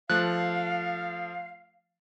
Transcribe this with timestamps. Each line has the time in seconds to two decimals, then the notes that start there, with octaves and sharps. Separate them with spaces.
0.10 F3 A3 F5 F#6